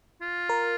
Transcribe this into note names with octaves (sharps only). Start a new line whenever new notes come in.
F4
A#4